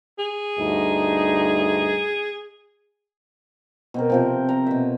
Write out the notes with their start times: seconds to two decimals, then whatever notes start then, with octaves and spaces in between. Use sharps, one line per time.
0.19 G#4
0.59 D2 G2 D#4
3.94 B2 C4 A#4
4.10 C3 F3 C4
4.49 A#5
4.67 B2 E5